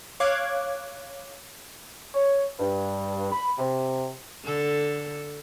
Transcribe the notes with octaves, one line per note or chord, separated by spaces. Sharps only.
C#5 F5 D6 F#6 G#6
C#5
G2
B5
C3
D3 A4